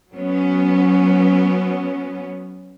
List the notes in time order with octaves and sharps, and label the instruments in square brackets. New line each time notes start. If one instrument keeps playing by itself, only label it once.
[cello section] F#3 B3 C#4